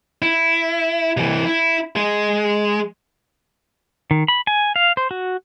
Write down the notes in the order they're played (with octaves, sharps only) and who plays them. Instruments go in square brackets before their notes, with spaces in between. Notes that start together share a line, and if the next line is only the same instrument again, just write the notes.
[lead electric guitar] E4
C2 E3
E4
G#3
[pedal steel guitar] D#3
B5
G#5
F5
C5
F#4